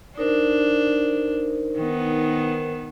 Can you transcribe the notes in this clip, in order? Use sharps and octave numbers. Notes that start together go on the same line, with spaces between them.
D4 D#4 A#4 C5
D#3 B3